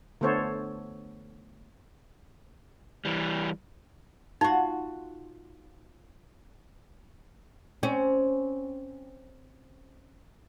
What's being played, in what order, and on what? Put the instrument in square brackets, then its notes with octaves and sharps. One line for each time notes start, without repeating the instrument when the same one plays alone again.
[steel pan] D3 A3 B3 A4 C5 C#5
[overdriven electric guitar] E3 G3
[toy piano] D#4 [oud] F4 F#4
[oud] C4 C#4